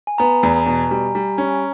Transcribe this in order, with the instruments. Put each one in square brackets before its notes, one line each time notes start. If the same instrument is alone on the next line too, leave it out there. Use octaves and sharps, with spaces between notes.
[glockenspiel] G#5
[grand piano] B3 [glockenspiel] A#5
[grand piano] E2
B2
G3
G3
C#4